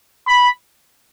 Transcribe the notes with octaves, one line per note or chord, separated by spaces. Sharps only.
B5